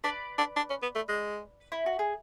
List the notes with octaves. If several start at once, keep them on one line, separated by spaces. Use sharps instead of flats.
D4 B4 D5
D4
D4
C#4
B3
A3
G#3
E4
F#4
G#4